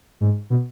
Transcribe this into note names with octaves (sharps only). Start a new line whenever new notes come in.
G#2
B2